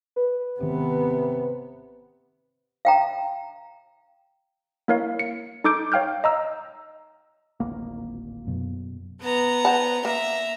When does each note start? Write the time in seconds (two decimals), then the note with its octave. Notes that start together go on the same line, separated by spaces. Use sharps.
0.16 B4
0.60 G#1 C3 D#3 B3
2.85 F5 G5 A#5
4.88 A#3 E4 A#4 C#5 F5
5.19 C#7
5.64 D#4 A4 D6 G6 D7
5.92 C#5 F5 G5 F6 G6
6.24 D#5 A#5 E6
7.60 D1 G#1 A#3
8.47 F#2 B2
9.22 B3 A#5
9.65 C5 F#5 A5
10.05 A#3 E5 A#5